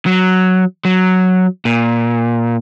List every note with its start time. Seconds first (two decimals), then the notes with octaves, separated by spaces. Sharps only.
0.06 F#3
0.85 F#3
1.65 A#2